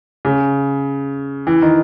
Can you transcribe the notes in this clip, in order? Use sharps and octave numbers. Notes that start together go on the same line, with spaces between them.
C#3
E3
D#3